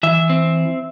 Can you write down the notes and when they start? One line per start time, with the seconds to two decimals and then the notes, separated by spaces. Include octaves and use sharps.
0.03 E3 E5
0.30 C4